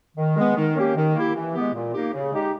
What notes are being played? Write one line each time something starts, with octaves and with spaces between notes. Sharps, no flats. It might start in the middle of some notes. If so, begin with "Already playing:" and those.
D#3
G#3 B3
D#3
A#3 C#4 G4
D#3
A#3 E4 G4
E3
G#3 B3 G4
A#2
A#3 D#4 G4
C#3
G#3 D#4 G4